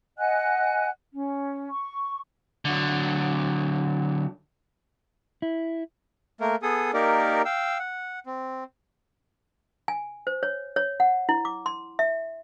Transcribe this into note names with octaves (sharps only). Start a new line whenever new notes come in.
D#5 F#5 G#5 F#6
C#4
C#6
D3 F#3
E4
A3 A#3 A#4
B3 G#4 A4 D#6
A#3 D#4 G4 A#4 D5
F5 G5 E6
F#5
C4
G#5
C5
C#5
C#5
F#5
E4
D6
C6
E5